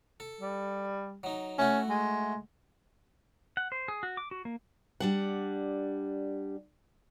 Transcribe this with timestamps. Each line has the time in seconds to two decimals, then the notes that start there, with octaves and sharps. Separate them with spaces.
0.20 A4
0.41 G3
1.23 F#3 D#4
1.58 A3 C#4 E4 F#4
1.89 G#3
3.57 F#5
3.72 C5
3.88 G#4
4.03 F#4
4.17 D6
4.31 F#4
4.45 A#3
5.00 G3 D4 F#5